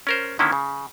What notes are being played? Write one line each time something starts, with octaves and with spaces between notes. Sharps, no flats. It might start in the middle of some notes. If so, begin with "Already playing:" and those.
C#4 A#4 C5
D3 D#3 A#3 C#4 E4
C#3